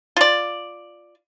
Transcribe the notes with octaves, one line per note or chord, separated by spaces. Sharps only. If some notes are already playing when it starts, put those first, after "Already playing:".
F4 D5